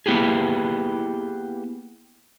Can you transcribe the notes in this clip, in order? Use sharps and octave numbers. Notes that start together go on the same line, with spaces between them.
A#3 B3 E4 G4 G#4